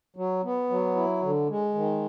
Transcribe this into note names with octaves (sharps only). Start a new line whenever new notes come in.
F#3
B3
F#3
E4
D3
G#3
D#3